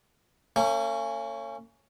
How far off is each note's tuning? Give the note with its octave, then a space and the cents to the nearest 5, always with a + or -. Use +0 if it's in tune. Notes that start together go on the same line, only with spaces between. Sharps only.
A#3 -45 C#4 +0